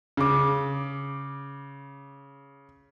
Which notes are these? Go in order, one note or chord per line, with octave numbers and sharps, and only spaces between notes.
C#3 D6